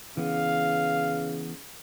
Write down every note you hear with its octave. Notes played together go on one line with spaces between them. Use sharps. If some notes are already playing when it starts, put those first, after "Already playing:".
C#3 E3 B3 F5